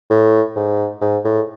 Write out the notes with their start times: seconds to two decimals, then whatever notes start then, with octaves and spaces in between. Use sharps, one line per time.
0.10 A2
0.56 G#2
1.01 G#2
1.25 A2